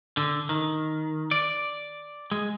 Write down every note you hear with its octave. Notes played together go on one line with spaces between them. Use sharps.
D3
D#3
D5
G#3